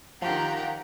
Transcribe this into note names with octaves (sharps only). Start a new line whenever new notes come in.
D#3 F3 G4 A#4 F5 F#5 A#5